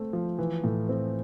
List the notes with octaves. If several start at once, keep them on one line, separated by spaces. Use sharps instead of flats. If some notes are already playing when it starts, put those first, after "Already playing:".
Already playing: A3 C4
F3
E3
A2
C4